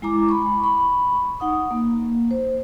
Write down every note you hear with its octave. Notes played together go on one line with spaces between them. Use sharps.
G#3 E4 A#5 D6
B5 C#6
B5 C#6
D#4 F#5 D#6
A#3
C5